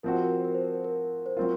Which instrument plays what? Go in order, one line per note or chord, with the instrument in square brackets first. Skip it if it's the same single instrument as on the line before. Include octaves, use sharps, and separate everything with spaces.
[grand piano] F3 C4 F#4 [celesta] A#4
[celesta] C5
A#4
C5
A#4
C5
A#4
C5
A#4
C5
[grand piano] F#3 C4 F4 [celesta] A#4